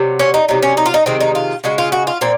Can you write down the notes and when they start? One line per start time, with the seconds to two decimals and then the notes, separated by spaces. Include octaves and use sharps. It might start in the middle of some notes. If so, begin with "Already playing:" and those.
Already playing: C3 F#3
0.19 C#4
0.34 D#4
0.48 C3 F#3 D#4
0.62 C#4
0.77 D#4
0.86 F4
0.94 D#4
1.06 C3 D#3 G#3 C4
1.21 D#4
1.35 F4
1.64 C#3 G#3 F#4
1.78 F4
1.92 F#4
2.07 F4
2.21 A#2 C4